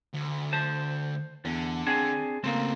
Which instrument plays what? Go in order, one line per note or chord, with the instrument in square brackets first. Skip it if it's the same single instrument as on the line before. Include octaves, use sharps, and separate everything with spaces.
[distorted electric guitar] D2
[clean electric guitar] C5 A5
[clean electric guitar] E2 [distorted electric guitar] D3
[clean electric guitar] C4 D4 G#4
[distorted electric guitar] C#3 A3 [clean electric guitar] A#3 C4